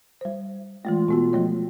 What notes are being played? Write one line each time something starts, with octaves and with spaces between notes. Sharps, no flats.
G3 C5
E3 G#3 A3 F4
B2 B3 F#4
F3 A3 C#5